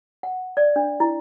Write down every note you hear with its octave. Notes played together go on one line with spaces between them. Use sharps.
F#5
D5
D4
E4